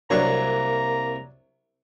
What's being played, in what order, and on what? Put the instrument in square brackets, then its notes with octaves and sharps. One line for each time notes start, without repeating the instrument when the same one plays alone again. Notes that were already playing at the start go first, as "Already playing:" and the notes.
[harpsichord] C2 C#6 [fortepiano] F#3 D4 C#5 [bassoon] A#3 [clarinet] A#5